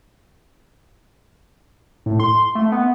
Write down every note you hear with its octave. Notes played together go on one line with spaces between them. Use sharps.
A2
C6
A3
B3